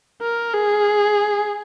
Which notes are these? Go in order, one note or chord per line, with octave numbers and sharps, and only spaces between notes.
A#4
G#4